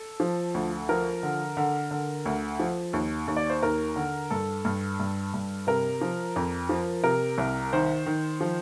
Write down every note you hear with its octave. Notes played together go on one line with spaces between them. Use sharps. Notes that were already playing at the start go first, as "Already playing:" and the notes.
Already playing: A4
F3
D2
F3 A#4
D3
D3
D3
D2
F3
D#2
D#2
D5
C5
D#2 A#4
D3
G2 A4
G2
G2
G2
C3 A#4
F3
F2
F3
C3 A#4
C2
D#3 C5
D#3
F3